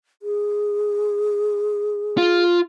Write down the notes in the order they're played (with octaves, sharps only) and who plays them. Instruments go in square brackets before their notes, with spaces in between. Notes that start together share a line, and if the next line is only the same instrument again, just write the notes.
[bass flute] G#4
[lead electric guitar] F4